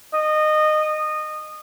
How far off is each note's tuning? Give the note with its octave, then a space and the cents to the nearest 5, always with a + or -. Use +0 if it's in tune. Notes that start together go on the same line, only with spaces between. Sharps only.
D#5 -20